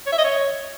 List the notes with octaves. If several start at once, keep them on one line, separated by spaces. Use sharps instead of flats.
C#5
E5
D#5
C#5